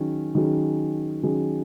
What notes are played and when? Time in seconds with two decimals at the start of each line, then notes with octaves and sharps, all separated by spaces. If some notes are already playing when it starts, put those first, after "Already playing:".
Already playing: D#3 F#3 C#4 G#4
0.35 D#3 F#3 C#4 G#4
1.23 D#3 F#3 C#4 G#4